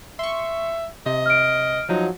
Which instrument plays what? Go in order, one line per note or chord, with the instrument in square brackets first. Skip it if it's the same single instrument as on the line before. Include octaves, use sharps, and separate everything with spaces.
[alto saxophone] E5 [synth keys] C6 C#6
[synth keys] C3 [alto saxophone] D#5
[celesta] F6 D7
[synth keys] F3 F#3 [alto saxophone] D#4